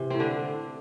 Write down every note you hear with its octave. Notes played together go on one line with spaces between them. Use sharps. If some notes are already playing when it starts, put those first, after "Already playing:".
Already playing: C3 E3
A2 C4
D3 D4